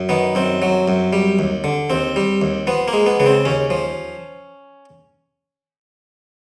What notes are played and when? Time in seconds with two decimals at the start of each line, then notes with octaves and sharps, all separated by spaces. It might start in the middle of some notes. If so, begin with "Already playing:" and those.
Already playing: F#2
0.09 D#3 B3
0.35 F#2 C4
0.62 F#3
0.88 F#2
1.13 G3
1.39 D#2
1.64 D3
1.90 D#2 C4
2.16 G3
2.42 D#2
2.67 F3 B3
2.88 A#3
2.93 G#3
3.06 B3
3.20 C#3 B3
3.26 C4
3.45 D#2 C#4
3.70 F3